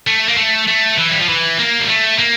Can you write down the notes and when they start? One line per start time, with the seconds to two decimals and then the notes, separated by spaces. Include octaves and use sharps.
0.07 A3
0.28 A#3
0.37 A3
0.68 A3
0.98 E3
1.11 G3
1.20 F3
1.29 E3
1.59 A#3
1.80 G3
1.89 A3
2.19 A#3